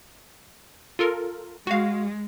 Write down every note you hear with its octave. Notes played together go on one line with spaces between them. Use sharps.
F4 A4 A#4
G#3 F#4 F5